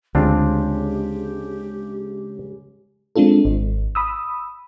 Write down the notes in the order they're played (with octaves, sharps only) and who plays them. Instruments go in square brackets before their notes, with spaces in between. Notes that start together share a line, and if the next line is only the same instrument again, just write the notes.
[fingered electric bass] D2 [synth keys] C#3 G#3 [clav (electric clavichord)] C4 D4 F4 [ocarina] G4
[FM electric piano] G#3 C4 D4 F4 A4
G#1
B5 D#6 E6